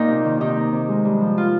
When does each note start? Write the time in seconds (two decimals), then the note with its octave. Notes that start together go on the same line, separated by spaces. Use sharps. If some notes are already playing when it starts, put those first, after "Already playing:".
Already playing: A#2 A#3 D#4
0.08 C3
0.25 D#3
0.40 C3 D#4
0.56 A#3
0.73 C3
0.89 G#3
1.04 G2
1.20 F3
1.38 F4